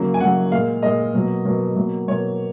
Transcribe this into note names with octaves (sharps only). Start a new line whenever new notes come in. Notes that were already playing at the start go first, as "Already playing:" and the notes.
Already playing: C#3 F#3 A#3
G#5
C#3 F#3 A#3 F#5
A#2 G#3 F5
A#2 G#3 D#5
B2 F#3 A#3
B2 F#3 A#3
B2 F#3 A#3
B2 F#3 A#3 C#5